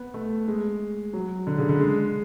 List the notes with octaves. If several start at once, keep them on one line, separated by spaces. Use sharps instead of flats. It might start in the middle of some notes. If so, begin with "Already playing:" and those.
Already playing: B3
A3
G#3
F#3
D3
C#3
D3
G#3